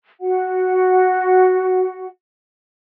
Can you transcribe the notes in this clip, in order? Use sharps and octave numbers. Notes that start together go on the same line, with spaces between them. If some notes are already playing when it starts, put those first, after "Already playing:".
F#4 F#5